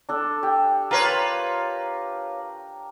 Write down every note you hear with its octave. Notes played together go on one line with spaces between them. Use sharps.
D4 A4
G4
F4 A#4 B4 C#5